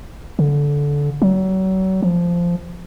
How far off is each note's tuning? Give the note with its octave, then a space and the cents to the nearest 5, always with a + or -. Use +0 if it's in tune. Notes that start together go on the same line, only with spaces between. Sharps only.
D3 -20
F#3 +35
F3 -10